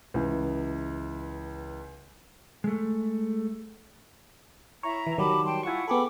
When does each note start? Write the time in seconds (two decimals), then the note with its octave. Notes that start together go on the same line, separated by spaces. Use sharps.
0.14 C#2 E3
2.64 G#3 A3
4.83 E4 C#5 E5 A#5
5.07 E3
5.18 D#3 F#3 G3 A5 B5 D6
5.44 G5 A5 C6
5.63 E4 F4 F#5 G#5 C#6
5.88 B3 G#4 A4 G5 B5 D6